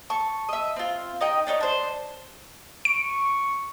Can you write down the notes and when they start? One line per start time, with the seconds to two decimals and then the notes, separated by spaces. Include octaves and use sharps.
0.10 A5 C#6
0.49 D#5 E5
0.76 C4 F4
1.21 D#4 D#5 G5
1.47 D4 D#4 B4 C#5
1.61 D4 C5
2.85 C#6 D7